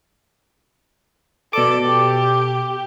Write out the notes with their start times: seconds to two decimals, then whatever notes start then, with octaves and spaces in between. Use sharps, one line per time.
1.53 B2 A4 D5 D6
1.86 G4